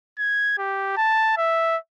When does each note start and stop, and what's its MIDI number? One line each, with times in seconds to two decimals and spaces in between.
0.19 0.58 92
0.58 0.96 67
0.97 1.33 81
1.37 1.77 76